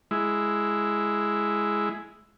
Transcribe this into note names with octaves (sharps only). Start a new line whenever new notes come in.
G#3 E4